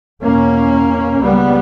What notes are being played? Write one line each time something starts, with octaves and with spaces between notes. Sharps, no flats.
E2 B2 A#3 C#4
C#2 C#3 G3 B3